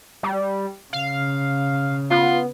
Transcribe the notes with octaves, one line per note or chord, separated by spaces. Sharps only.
G3
C#3 F5
B3 F4